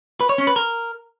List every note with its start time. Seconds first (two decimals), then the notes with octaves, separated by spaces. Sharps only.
0.20 B4
0.29 C#5
0.38 C#4
0.47 B4
0.56 A#4